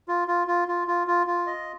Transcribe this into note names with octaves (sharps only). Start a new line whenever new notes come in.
F4
F4
F4
F4
F4
F4
F4
D#5